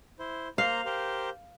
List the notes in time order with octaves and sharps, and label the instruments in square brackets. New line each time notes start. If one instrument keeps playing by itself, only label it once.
[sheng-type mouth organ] E4 C5
[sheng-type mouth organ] A#3 C5 A#5 [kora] F5
[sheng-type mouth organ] G4 A#4 C5